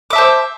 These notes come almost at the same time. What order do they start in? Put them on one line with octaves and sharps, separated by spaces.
D6 E5 A5 C5